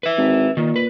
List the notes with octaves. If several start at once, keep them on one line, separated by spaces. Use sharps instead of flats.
B4 E5
G#1
A#2 D#3
B4